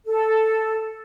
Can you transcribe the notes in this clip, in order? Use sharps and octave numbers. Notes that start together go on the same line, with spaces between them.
A4